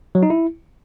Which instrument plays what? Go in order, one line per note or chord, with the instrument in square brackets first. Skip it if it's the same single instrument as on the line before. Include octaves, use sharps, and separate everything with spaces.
[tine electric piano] F#3
D#4
E4